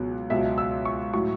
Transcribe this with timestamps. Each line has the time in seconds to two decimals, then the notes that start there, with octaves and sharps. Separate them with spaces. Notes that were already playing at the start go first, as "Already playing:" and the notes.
Already playing: C#2 B2 F#3
0.30 C#2 B2 F#3 E5
0.58 E6
0.85 C#6
1.13 A2 F#3 C#6